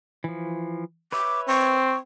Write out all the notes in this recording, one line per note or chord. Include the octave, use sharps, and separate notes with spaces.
E3 F3
B4 C#5 E5 D6
C4 C#6